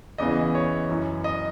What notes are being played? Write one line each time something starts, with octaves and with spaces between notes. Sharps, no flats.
E2 C#3 E3 D#5
C#5
F#2 E3
D#5